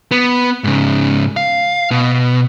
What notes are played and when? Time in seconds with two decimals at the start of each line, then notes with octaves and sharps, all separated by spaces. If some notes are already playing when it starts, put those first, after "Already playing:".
0.11 B3
0.64 G#2 C#3
1.37 F5
1.91 B2